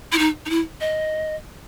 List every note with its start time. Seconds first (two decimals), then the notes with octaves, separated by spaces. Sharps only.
0.12 E4
0.19 D#4
0.46 D#4
0.50 E4
0.81 D#5